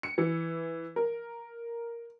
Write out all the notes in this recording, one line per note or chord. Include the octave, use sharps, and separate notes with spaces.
C#7
E3
A#4